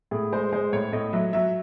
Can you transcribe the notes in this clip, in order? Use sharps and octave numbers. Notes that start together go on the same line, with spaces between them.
A2 G#4
G#3 C5
G#3 C5
A2 C#5
A2 D#5
F#3 E5
F#3 E5